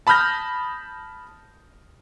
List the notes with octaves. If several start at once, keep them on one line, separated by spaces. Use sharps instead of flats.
A5 B5 D#6 F6 G6 A#6